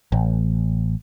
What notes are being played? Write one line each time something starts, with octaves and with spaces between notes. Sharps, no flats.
A1